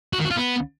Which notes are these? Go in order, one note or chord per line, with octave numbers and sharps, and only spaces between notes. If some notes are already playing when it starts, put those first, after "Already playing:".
F#4
D#3
F#4
F4
B3